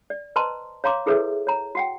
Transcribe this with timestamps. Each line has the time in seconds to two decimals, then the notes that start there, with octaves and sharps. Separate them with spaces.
0.10 D5
0.36 B4 C5 D#5 A5 A#5 C6
0.84 C#5 F5 A#5 C6 D6
1.06 E4 G#4 A4 B4 C#5 E5
1.47 C#5 A#5
1.75 F#4 F#5 G5